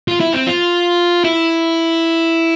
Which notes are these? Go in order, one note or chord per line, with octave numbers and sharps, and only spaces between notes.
F4
E4
C4
F4
E4